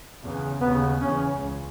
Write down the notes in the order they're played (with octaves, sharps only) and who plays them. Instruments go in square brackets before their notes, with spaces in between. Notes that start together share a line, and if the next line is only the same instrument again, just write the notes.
[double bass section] E2 C#3
D#2 C#3 B3
E2 C#3 C#4
C#2